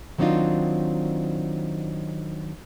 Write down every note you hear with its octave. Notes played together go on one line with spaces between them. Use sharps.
D#3 F#3 C4 D4 D#4 F4